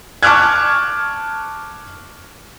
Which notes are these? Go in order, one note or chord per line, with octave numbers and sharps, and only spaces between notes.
A5 C#6 D6 F6 F#6 G#6